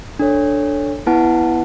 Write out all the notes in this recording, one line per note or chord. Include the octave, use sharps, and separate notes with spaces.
D4 A4 C#5
B3 E4 B4 F#5 A5